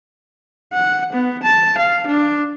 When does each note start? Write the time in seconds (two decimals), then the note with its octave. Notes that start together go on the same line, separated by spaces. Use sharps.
0.73 F#5
1.13 B3
1.43 A5
1.78 F5
2.07 D4